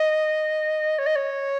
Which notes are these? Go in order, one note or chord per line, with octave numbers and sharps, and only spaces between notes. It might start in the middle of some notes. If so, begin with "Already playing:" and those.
Already playing: D#5
C#5
D#5
C#5